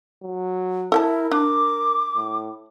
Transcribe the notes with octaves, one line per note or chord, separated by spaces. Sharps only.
F#3
E4 A4 A#4 G5 A5
D4 D6
A2